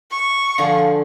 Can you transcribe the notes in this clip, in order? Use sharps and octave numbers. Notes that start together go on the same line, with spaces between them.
C#6
D3 F3 G#4 F5